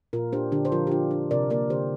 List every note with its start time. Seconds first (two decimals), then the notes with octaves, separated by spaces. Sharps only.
0.13 A#2 F4 A#4
0.33 D4 G4 C5
0.52 D3 D4 G4
0.65 C5
0.72 F3 F4 A#4
0.87 G4
0.91 D4 F4
1.11 D4
1.31 C3 A#4 D5
1.50 A#3 A#4 D5
1.70 D3 G4 C5